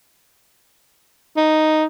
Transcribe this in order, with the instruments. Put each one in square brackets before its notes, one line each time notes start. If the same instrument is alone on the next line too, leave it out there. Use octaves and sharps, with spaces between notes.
[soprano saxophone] D#4